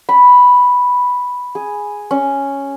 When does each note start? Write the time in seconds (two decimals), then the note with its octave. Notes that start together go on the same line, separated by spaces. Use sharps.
0.09 B5
1.55 G#4
2.11 C#4